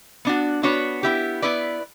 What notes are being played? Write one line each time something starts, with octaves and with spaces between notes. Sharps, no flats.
B3 D4 F#4
B3 D4 F#4 C#5
B3 E4 G4
B3 E4 B4 D5